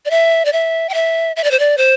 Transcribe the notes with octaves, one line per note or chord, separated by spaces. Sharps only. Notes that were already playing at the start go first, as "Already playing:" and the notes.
D5
E5
D5
E5
G5
E5
E5
D5
C5
D5
C5